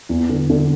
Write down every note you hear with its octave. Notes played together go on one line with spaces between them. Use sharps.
E2
D3
D3